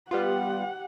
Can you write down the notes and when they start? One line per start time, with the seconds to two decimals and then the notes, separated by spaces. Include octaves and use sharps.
0.11 G3 B3 F4 G4 F#5